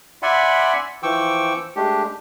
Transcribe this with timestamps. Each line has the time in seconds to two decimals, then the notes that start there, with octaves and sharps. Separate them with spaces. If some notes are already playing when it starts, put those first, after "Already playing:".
0.22 D5 E5 F#5 G#5 B5 C6
1.03 E3 F3 G5 C#6 D6 E6
1.76 G#3 A3 D4 G4